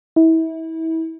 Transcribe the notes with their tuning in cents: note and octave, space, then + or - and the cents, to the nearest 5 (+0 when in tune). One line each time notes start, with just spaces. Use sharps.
E4 -30